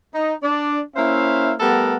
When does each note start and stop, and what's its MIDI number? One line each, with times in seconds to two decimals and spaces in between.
0.15 0.34 63
0.43 0.80 62
0.43 0.80 74
0.96 1.53 58
0.96 1.53 61
0.96 1.53 64
0.96 1.53 72
0.96 1.53 76
0.96 1.53 77
1.60 1.97 55
1.60 1.97 57
1.60 1.97 59
1.60 1.97 69
1.60 1.97 70
1.60 1.97 78